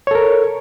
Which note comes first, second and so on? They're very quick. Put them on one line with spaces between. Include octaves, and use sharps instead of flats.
C#5 A4 A#4